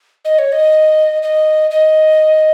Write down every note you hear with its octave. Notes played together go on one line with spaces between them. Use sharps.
D#5
C#5
D#5
D#5
D#5